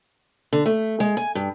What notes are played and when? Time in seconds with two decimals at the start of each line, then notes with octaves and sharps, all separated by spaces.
0.53 D3
0.66 A3
1.00 G#3
1.17 G#5
1.35 G2